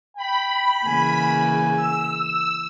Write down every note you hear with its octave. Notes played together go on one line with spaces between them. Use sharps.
G5 B5
C#3 E3 A#3 G#5
E6